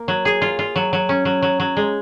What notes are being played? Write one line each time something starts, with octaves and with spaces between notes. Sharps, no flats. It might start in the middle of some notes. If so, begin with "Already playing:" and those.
Already playing: A#3
F#3
G#4
F4
F4
F#3
F#3
C#4
F#3
F#3
F#3
G#3